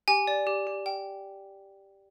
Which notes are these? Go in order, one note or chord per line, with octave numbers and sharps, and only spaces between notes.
G4 G#5
D5
G4
G4
G5